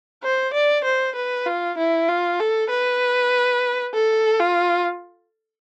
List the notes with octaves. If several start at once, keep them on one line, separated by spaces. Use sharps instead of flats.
C5
D5
C5
B4
F4
E4
F4
A4
B4
A4
F4